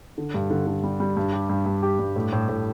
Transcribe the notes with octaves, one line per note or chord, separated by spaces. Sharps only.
D3
G2
D3
D3
G3
G3
G2
G4
G2
G2
G4
G2
A2
A2
A2